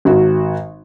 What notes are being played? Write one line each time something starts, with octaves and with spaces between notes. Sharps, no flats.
G#1 F#4